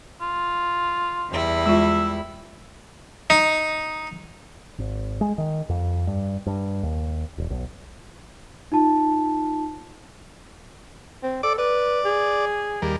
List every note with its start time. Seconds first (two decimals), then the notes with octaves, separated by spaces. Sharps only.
0.21 F4
1.29 E2 G3 E4
1.66 G#3 F4 E5
3.30 D#4
4.79 G#1
5.21 G#3
5.38 D#3
5.69 F2
6.07 G2
6.47 G2
6.83 D#2
7.38 E1
7.50 B1
8.72 D#4 F4 A5
11.23 C4
11.43 A4 D5 D6
11.58 B4 D5
12.05 G#4
12.82 D#2 G3 A#4